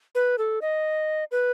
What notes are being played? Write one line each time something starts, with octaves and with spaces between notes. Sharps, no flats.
B4
A4
D#5
B4